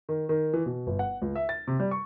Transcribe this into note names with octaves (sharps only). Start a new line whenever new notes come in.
D#3
D#3
E3
B2
G1
F#5
C#2
E5
A6
C3
G3
C#6